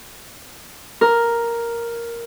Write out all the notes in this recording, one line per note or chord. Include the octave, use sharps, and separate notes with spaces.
A#4